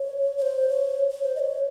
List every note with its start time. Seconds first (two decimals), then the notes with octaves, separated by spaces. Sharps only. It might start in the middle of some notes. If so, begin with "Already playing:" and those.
Already playing: C#5
0.37 C#5
0.42 C5
0.68 C#5
1.11 C#5
1.23 C5
1.35 D#5
1.39 C#5